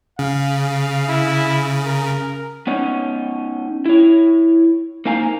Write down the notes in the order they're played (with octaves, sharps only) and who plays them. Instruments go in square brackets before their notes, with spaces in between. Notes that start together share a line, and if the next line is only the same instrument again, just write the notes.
[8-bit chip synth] C#3 [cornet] F5
[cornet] E4
A#4
[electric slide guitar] B3 C#4 D#4 C#5
E4 C#5
A#3 C4 D#4 F5 G#5 A#5